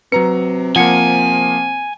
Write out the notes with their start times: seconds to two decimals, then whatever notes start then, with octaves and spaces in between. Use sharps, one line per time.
0.12 C3 F#3 B4 A#5 C#7
0.76 F3 A#3 F#5 G#5 C#7